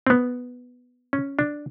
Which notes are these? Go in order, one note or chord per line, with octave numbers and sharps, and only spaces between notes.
C4
B3
C#4
D4